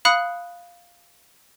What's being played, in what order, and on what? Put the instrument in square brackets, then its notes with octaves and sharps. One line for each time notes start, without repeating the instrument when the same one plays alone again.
[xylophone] F5 B5 D#6 F#6 C#7